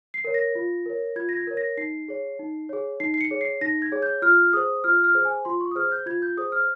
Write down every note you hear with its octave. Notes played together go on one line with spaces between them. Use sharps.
C7
A#4 C#5
A#6
F4
A#4 C#5
F4 G#6
A#6
G#6
A#4 C#5
A#6
D#4 C7
G#4 C#5
D#4
G#4 C#5
D#4 C7
C7
C#7
G#4 C#5
C7
D#4 A#6
G#6
G#4 C#5
G6
F4 F6
G#4 C5 D#6
F4 F6
F6
G#4 C5
G#5
F4 C6
C#6
D#6
G#4 C5 F6
G6
F4 G#6
G6
G#4 C5 D#6
F6